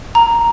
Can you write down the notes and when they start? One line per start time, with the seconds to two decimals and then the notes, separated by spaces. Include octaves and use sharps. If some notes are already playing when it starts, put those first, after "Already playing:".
0.15 A#5